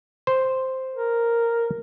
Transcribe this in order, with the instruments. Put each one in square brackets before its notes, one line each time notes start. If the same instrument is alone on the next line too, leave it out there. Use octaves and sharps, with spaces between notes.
[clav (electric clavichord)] C5
[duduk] A#4